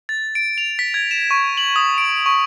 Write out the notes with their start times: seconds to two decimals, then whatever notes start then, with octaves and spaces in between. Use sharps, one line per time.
0.09 A6
0.35 D7
0.58 F7
0.79 B6
0.94 G#6
1.11 E7
1.31 C#6
1.57 F#7
1.76 D#6
1.98 D7
2.26 C#6